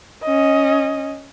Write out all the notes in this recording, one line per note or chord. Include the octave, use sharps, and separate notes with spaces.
C#4 D#5